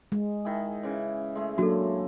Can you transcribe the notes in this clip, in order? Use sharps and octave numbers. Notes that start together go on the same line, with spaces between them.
G#3
D#3 E4 G#4
C#3 E3
G#3 A3
F#3 A#3 D4 F#4 A4